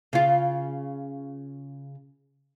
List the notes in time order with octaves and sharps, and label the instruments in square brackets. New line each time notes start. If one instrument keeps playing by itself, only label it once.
[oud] C#3 F4